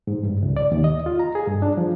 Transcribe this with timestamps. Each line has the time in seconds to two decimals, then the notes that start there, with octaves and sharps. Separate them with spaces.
0.07 G#2
0.23 G2
0.43 C#2
0.57 D5
0.72 D#2
0.84 D#5
1.06 F4
1.20 A#5
1.35 G#4
1.47 G2
1.62 D4
1.77 F3